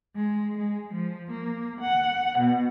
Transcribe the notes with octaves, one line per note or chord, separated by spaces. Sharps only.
G#3
G#3
F3
A#3
F#5
B2